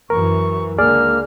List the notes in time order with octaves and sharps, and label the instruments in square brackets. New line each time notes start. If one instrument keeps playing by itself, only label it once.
[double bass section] F#2 E3 [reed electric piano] A#4 [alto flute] C#6
[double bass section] C#2 D3 [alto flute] A#3 [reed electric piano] G#4 D5 [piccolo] F6